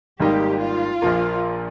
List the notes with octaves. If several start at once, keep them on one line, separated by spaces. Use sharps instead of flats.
G#1 G#2 G3 A#3 D#4 G4
F4
A#1 A#2 F3 A#3